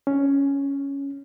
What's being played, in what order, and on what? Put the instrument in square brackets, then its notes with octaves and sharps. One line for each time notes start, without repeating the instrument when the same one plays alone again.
[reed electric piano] C#4